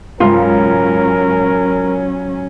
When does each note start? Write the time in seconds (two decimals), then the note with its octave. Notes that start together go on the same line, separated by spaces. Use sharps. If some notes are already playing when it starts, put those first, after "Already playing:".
0.20 C#2 G#2 F#3 C#4 F4 A#4